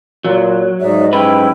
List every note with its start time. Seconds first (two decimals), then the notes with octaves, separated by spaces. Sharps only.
0.25 A#2 F#3
0.81 G#2 D#4 D5 E5
1.13 F#2 E4 G4 B4 G5